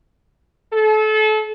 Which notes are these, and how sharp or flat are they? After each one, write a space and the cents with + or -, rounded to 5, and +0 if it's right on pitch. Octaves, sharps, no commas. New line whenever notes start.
A4 -30